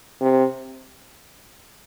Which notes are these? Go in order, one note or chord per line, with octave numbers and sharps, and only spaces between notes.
C3